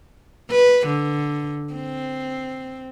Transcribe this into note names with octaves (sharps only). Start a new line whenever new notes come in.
B4
D3
C4